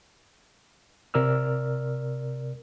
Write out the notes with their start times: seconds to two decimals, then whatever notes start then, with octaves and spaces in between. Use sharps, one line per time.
1.14 C3 A#4 D5 E6 F6